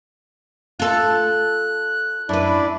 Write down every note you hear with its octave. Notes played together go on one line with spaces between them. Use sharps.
F4 A4 F#6
F#2 D4 E4 B4 D5